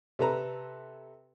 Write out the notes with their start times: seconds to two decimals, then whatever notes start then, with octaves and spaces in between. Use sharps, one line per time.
0.19 C3 A4 B4 A#5